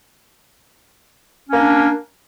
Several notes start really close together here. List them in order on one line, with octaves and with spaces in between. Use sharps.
C#4 A#3 D4